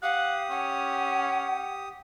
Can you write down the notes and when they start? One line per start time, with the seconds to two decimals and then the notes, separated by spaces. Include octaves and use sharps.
0.03 G4 F5 F#5 D#6
0.50 C#4 F#5